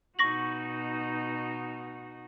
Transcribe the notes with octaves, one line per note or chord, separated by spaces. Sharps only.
B2 D#4 F#4 C#6 A#6 F#7